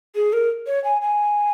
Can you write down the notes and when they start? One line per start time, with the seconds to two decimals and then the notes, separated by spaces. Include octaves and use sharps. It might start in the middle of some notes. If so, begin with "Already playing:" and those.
0.15 G#4
0.33 A#4
0.67 C#5
0.84 G#5
1.02 G#5